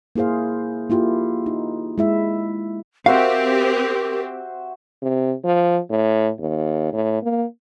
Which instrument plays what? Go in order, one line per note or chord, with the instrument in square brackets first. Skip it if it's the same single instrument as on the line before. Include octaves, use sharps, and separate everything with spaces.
[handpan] A#3 E4 G#4 C5 F5
A#3 E4 F4 G4
D#4
G#3 E4 E5
[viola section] C4 G4 [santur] F#4 C5 E5 [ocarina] A#4 [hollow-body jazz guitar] F5
[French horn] C3
F3
A2
D#2
A2
A#3